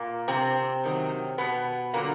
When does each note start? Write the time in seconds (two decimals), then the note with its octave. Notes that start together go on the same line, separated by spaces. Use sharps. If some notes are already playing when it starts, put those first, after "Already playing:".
Already playing: A#2 A#3
0.28 C3 C4
0.83 F#2 D#3 F#3
1.38 B2 B3
1.93 A#2 D3 F#3 A#3